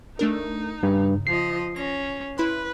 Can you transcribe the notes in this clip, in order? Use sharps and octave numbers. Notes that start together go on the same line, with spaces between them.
A3 D4 D#4 A#4
G2 C#3
F3 D#5 C7
C#4 A#6
E4 B4 B5 C6